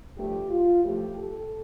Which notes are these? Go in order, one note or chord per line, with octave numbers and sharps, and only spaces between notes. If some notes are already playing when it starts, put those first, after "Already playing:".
G2 F3 A3 G4
F4
A2 F3 A3 G4
A4